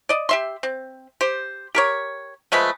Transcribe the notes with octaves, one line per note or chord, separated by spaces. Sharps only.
D5 D#5
G4 E5 C6
C4
G4 C5
G4 A#4 C#5
F3 G#3 A3 B4